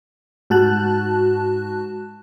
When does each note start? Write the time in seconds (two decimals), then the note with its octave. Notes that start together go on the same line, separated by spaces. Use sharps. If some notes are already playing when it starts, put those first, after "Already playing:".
0.50 G#2 F#4 A5 F#6